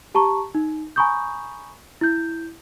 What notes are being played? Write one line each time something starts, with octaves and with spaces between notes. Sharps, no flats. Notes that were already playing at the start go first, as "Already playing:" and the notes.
G4 A5 A#5 C#6
D#4
G#5 A#5 B5 C#6 D#6 G6
E4 G6